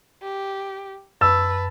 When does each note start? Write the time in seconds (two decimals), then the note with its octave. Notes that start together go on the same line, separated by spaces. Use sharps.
0.22 G4
1.21 F#2 B4 A5 E6 A6